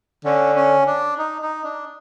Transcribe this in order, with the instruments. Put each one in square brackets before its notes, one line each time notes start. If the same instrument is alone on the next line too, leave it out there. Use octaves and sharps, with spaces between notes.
[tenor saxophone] D3 [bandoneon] C#4
[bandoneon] C#4
D4
D#4
D#4
D4